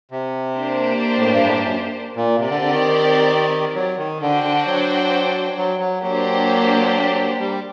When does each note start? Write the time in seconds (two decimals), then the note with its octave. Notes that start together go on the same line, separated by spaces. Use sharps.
0.11 C3
0.56 A#3 D4 G4 C5
1.17 A2
1.32 G2
1.45 A2
1.54 G2
1.63 F#2
2.16 A#2
2.39 C3 C4 G4 A#4 D5
2.50 D3
2.61 D3
2.73 D#3
3.75 F#3
3.98 D#3
4.21 D3 D4 F#4 C5 G5
4.43 D3
4.66 F#3
5.58 F#3
5.80 F#3
6.03 F#3 A#3 D4 G4 C5
7.39 G3